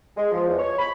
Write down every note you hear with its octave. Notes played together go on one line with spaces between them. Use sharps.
G#3
F3
E2
C#5
B5